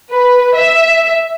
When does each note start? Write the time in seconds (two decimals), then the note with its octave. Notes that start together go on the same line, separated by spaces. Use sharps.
0.11 B4
0.55 E5